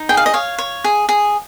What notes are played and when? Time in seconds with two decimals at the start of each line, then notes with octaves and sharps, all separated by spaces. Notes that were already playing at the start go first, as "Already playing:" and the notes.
Already playing: D#4
0.09 G#4 G5
0.17 F5
0.26 D#5
0.34 C#5 F5
0.58 C#5
0.84 G#4
1.09 G#4